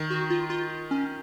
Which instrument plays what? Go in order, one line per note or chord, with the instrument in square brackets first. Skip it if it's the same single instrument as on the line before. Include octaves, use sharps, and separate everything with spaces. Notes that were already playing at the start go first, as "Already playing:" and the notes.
Already playing: [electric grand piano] D#3
[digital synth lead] F#4
F4
F4
C#4